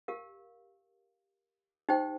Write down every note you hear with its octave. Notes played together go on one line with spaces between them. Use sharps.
G4 A#4 F5
D#4 G4 C5 G5